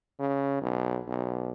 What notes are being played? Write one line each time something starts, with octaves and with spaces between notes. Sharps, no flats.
C#3
B1
B1